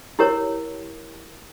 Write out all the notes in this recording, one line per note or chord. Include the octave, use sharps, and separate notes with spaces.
E4 G4 A#4 C#5